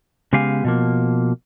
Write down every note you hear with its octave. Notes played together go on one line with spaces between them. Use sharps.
C#3 G#3 B3 G4 F5 G#5
B2 F3 A#3